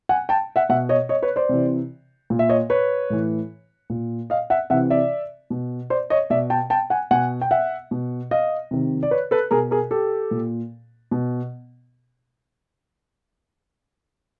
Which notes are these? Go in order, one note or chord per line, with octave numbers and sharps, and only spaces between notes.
F#5 G#5
G5 A5
E5 F#5
B2 E5 F#5
C#5 D#5
C#5 D#5
B4 C#5
C5 D5
C3 E3
A#2
E5
C#5 D#5
B4 C#5
A2 E3
A#2
D#5 F5
E5 F#5
C3 E3 E5 F#5
D5 E5
B2
C5 D5
C#5 D#5
B2 D5 E5
G5 A5
G5 A5
F#5 G#5
B2 F#5 G#5
G5
E5 F#5
B2
D#5 F5
C3 D#3
D5
B4 C#5
A4 B4
B2 G#4 A#4
G#4 A#4
G4 A4
A#2
B2